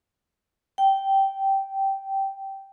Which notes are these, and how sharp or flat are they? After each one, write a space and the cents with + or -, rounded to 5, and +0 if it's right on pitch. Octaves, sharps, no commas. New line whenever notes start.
G5 -10